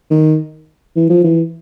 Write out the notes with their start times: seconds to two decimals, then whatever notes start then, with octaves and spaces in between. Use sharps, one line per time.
0.11 D#3
0.96 E3
1.10 F3
1.24 E3